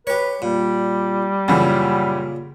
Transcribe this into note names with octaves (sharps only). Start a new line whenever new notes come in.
G4 B4 C#5
A#2 G3
F#2 A#2 C#3 E3